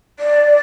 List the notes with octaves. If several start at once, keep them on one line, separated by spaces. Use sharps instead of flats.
D5